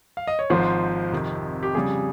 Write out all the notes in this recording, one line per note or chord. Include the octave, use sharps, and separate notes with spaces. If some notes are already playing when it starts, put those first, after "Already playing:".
F5
D#5
C#5
G#1 G#2 F3 C5
F2 C3 D#3
G4
F2 C#3 G3 G#4